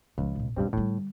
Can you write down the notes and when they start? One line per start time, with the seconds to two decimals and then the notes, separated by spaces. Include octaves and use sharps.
0.18 C#2 F3 F4
0.35 D1 B2
0.56 G2 B2 G3 C4 C#4
0.73 A2 D3 G3